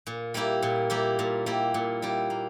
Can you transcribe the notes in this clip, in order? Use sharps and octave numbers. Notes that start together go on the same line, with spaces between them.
A#2
G3 A#3 E4 G4
A#2
G3 A#3 E4 G4
A#2
G3 A#3 E4 G4
A#2
G3 A#3 E4 G4
A#3